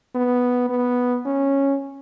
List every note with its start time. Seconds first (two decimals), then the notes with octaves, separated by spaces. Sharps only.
0.15 B3
0.69 B3
1.25 C#4